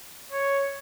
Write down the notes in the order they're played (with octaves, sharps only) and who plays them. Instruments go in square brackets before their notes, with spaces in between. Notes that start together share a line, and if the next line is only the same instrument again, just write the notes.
[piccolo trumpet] C#5